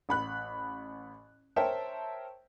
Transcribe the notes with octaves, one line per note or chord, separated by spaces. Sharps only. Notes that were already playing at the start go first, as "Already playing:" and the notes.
A1 B5 F#6
A#4 C5 C#5 E5 G5 A5